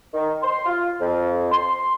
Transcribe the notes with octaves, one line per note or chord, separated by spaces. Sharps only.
D#3
C6
F4
F2
C6